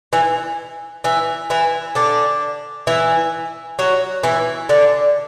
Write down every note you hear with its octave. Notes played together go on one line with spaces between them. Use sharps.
E3 E4
E3 E4
E3 E4
D3 D4
E3 E4
F#3 F#4
E3 E4
D3 D4